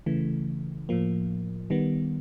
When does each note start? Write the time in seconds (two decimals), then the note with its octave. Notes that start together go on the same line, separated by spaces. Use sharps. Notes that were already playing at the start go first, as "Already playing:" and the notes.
0.06 C#3 E3 A3
0.89 A2 F3 A#3
1.70 D#3 G3 B3